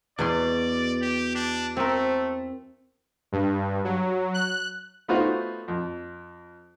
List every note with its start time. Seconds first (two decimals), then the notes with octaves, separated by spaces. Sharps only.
0.19 E2 B2 D5 C6
1.02 G4
1.35 D4
1.77 A3 C4 A#4
3.32 G2
3.85 F#3
4.34 F#6
5.08 A3 B3 D#4 F4 F#4 C5
5.68 F2